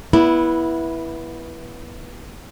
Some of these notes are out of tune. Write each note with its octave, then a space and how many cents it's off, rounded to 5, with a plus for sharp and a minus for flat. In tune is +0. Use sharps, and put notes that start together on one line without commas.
B3 -20 E4 +0